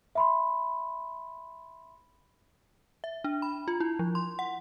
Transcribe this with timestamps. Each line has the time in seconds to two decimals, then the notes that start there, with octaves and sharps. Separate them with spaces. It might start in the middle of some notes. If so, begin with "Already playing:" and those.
0.15 E5 B5 C6
3.04 E5
3.24 D4
3.42 B5
3.68 F4
3.80 E4
3.99 F3
4.15 C6
4.39 F#5